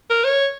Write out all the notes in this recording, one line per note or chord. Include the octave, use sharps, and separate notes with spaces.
A#4
C#5